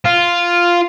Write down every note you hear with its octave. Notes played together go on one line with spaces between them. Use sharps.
F4